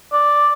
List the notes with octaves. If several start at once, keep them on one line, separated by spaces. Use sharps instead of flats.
D5